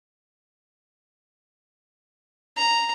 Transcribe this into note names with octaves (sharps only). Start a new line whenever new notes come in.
A#5